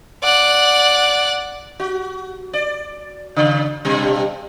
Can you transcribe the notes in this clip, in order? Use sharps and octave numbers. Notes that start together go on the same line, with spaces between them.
D5 F#5
F#4
D5
C#3
G2 B2 G3